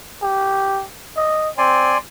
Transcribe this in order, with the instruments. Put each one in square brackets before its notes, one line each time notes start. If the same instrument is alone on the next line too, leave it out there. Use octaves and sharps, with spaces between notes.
[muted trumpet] G4
D#5
[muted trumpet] C4 [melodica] D5 G#5 C6